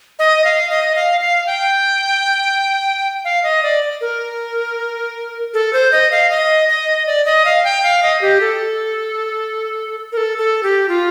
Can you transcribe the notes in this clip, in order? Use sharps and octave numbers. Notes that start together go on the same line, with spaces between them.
D#5
F5
D#5
F5
F5
G5
F5
D#5
D5
A#4
A4
C5
D#5
F5
D#5
D#5
D5
D#5
F5
G5
F5
D#5
G4
A4
A#4
A4
A4
G4
F4